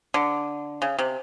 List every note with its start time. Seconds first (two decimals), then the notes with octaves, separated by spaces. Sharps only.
0.14 D3
0.82 C#3
0.99 C3